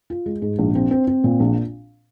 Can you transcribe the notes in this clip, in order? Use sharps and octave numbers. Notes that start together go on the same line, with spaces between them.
F4
G#3
G#2
A#1
C4
C4
C4
A#2
A#1